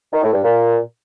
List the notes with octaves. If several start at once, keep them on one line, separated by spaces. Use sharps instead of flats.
D#3
A2
G2
A#2